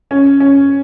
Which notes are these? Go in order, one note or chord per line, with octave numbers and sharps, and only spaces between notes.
C#4
C#4